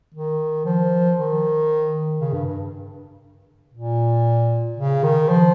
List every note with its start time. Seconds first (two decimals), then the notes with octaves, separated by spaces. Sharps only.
0.14 D#3
0.66 F3
1.17 D#3
2.19 C#3
2.33 G2
2.46 G2
3.74 A#2
4.77 C#3
5.03 D#3
5.29 F3